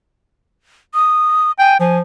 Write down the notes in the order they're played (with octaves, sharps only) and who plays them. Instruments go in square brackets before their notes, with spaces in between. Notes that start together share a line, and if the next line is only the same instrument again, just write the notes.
[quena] D#6
[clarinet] G5 [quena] G#5
[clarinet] F3 [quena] G#5